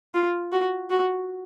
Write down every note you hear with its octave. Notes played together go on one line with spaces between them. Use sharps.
F4
F#4
F#4